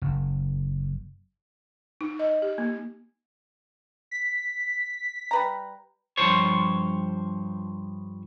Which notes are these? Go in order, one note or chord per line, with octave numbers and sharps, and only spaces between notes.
F#1
D#4
D#5
G4
A#3
B6
G3 B4 A#5
G2 D#3 F3 C5 C#5